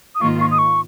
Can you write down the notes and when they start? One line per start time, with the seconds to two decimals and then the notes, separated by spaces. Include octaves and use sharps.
0.15 D#6
0.21 G#2 D#3 A#3 F4 C#6
0.41 C#6
0.51 D#6
0.58 C#6